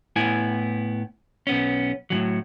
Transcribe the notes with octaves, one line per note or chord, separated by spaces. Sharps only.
A2 B3 E4 G#5
B1 B3 C#4
A2 E3 F#3